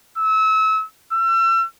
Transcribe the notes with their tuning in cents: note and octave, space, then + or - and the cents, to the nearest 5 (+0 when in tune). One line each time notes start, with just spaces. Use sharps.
E6 -30
E6 +40